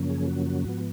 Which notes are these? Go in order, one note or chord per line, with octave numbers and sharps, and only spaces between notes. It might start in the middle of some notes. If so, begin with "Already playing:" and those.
Already playing: F#2 C#3 F3 A#3 C#4
G#4
F#4
F#4
G#2 F3 B3 F#4